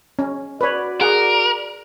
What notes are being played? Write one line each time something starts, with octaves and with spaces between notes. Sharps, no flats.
C#4
F#4 B4 C#5 D5
G#4 A#4 F#5